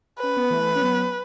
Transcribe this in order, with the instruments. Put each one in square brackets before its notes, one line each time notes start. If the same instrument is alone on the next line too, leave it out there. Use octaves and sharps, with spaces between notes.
[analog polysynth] C#4 [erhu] B4
[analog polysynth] B3
E3 A3
C#4
F#3 B3